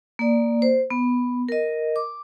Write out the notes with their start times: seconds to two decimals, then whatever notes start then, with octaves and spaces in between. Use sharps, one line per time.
0.19 A#3 D5
0.62 C5
0.90 B3
1.49 A#4 D#5
1.96 D6